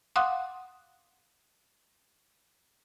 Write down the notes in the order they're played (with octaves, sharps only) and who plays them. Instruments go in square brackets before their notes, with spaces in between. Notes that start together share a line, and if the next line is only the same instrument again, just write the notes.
[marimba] F5 F#5 C6 D6 D#6 F#6